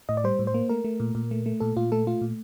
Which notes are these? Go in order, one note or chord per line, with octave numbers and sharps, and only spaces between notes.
A2 D#5
D5
G3 C5
A2
C5
A#3
A3 A#4
A3
A#2
A#2
A3
A3
A#2 A4
A#2 F4
A3 A4
A3 F4
A#2